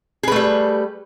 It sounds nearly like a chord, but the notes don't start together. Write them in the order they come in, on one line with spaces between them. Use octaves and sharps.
G#4 B4 A3 G3